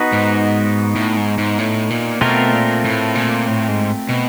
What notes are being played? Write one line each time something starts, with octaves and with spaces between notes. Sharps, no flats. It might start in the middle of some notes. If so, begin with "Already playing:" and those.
Already playing: B3 D#4 F#4 B4
G#2
A2
G#2
G#2
A2
A#2
B2 A3 C4 F4 A#4
A#2
A2
A#2
A2
G#2
B2